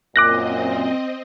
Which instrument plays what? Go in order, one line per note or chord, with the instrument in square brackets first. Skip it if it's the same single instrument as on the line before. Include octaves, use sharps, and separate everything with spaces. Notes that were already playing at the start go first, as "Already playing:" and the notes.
[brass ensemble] F#2 A#2 [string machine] C4 D#5 [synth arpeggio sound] D6 F#6 A#6